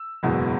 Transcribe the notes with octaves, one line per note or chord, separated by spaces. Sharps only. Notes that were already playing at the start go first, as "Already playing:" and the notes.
Already playing: E6
F#1 E2 B2 G#3